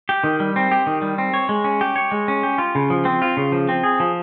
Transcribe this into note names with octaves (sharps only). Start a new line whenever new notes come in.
G4
D#3
G3
C4
G4
D#3
G3
C4
C#5
G#3
C#4
G4
C#5
G#3
C#4
G4
F4
C#3
F3
C4
F4
C#3
F3
C4
G#4
F3